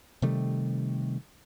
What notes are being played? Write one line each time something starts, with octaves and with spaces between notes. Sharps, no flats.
C3 D#3 G3 A3